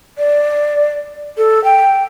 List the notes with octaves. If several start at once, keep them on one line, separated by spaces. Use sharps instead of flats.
D5
A4
G5